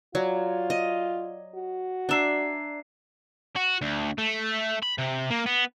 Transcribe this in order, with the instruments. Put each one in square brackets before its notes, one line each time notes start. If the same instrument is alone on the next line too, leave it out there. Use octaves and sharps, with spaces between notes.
[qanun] F#3 [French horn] F4 [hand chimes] D5
[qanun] D#5
[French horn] F#4
[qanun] D4 E5 [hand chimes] D5 A#5 C7
[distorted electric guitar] F#4
D2
A3
B5
C3
A#3
B3